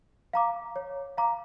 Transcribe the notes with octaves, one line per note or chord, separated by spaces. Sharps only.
F5 A#5 D6
C#5
F5 A#5 D6